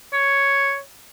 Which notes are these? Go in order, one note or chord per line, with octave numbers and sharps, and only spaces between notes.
C#5